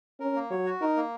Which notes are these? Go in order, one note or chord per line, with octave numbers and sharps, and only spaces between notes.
C#4 A#4
A#3
F#3 C#5
F#4
D#4 A#4
A#3